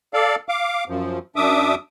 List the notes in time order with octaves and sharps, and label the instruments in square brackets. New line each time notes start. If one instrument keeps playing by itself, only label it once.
[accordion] A4 D5 F5
F5 D6
F#2 F3
F#2 D4 E5 D6 D#6